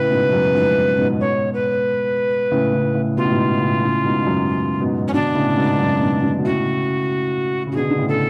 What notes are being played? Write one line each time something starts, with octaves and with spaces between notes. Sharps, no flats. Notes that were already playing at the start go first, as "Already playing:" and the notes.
Already playing: A2 C#3 B4
G#2 B2
F#2
F2 G#2
G#2 B2
C#5
B4
A2 C#3
A2 C#3
A2 C#3
B2 F4
A2
G#2 B2
A2 C#3
A2 C#3
G#2 B2
F#2
G#2 B2
C#4
B2 D3 D4
A2 C#3
G#2 B2
F#2
G#2 B2
B2 D3
B2
A2 C#3 F#4
C#3
F#4
B2 D3 G#4
D3
A2 C#3
A4